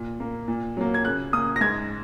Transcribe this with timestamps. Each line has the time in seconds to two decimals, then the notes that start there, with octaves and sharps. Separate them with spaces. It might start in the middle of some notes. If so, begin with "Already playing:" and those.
Already playing: A#2
0.20 A#3
0.48 A#2
0.77 F#3 A#3
0.94 G#6
1.05 C#3 F#6
1.33 A#3 D#6
1.56 A#6
1.61 G#2 G#6